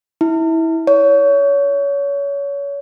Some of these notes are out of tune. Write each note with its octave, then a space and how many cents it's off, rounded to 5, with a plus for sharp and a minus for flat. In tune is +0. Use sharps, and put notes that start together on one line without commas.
E4 -20
C#5 +25